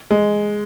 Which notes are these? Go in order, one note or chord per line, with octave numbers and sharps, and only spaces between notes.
G#3